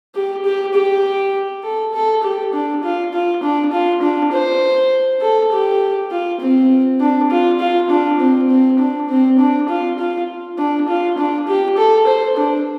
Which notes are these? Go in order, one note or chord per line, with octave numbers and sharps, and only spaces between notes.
G4
G4
G4
A4
A4
G4
D4
F4
F4
D4
F4
D4
C5
A4
G4
F4
C4
D4
F4
F4
D4
C4
C4
D4
C4
D4
F4
F4
D4
F4
D4
G4
A4
C5
D4